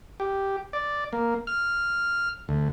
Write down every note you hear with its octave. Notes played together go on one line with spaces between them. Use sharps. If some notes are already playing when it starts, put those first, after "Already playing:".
G4
D5
A#3
F6
D2